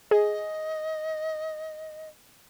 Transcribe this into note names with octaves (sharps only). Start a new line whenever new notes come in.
G#4 D#5